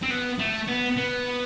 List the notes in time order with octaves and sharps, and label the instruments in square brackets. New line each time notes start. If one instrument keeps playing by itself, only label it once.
[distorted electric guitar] C4
B3
A3
B3
B3